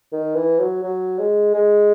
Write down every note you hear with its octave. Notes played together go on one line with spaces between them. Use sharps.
D#3
E3
F#3
F#3
G#3
G#3